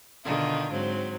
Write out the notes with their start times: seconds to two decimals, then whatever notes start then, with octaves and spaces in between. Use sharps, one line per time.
0.24 B2 D3 D#3 D#4 F4
0.71 G#2 F#3 C4